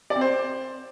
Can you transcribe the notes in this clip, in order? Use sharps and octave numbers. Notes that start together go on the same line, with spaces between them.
D5
C4
C5